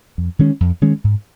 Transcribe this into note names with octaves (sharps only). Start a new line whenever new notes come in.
F2
D#3 G#3 C#4
F2
D#3 G#3 C#4
G#2